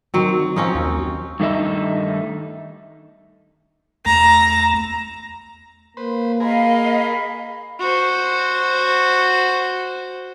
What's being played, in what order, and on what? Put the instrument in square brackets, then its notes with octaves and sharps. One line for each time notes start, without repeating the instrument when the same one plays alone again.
[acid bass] D#3 [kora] F#3 C4
[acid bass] F3 [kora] C4 C#4 D#4
[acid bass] D#2
[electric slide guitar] G2 D#3 A3 D#4 E5
[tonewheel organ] E2 A3 [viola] A#5
[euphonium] A#3 [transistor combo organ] B4 C5
[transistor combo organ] G#4 A#4 [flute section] D#5 F5 [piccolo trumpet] B5
[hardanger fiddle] F#4 C5